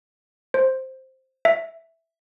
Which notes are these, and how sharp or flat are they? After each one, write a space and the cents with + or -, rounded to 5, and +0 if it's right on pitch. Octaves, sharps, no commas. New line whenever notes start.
C5 +5
E5 +0